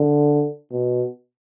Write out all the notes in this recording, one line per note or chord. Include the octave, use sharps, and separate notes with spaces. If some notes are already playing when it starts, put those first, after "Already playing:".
Already playing: D3
B2